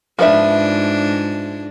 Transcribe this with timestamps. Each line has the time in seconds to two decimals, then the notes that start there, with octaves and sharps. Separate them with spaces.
0.19 G#2 F3 D4 B4 E5